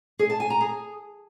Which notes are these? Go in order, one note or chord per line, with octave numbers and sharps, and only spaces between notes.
G#4
A5
G#5
A#5
G#4